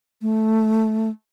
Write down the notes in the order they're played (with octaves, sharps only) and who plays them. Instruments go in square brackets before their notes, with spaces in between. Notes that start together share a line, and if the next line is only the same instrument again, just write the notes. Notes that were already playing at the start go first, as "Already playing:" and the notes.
[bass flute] A3